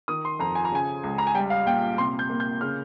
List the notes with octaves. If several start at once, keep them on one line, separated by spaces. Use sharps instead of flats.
D#3 D#6
C6
F2 A#5
G#5
A#5
C#3 G#5
C#2
A#5
G#5
G3 G5
F5
A#2 G5
C3 C6
G6
A#3
G6
C#3 F6